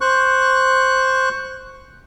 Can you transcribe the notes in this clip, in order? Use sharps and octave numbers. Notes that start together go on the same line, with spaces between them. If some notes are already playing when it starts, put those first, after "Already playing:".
C5 C#6 F#6